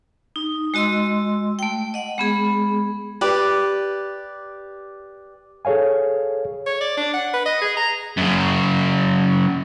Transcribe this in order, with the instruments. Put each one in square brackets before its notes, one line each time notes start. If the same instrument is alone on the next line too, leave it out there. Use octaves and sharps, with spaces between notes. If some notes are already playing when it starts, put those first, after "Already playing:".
[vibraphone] D#4
G#3 F#4 D#5 C6 E6
A3 G5
D#5 F#5
G#3 B3 G#4
[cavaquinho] G4 B4 D5
[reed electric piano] G#4 A4 C#5 F5 G#5
[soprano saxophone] C#5
D5
D4
F#5
B4
D#5
G#4
A#5
[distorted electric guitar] F#2 C#3